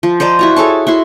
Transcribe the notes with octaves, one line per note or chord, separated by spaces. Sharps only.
F3
C5 D5 D#5 A#5
E4 F#4 A#5
G#4 A4 C#5 A5
E4 F#4 C6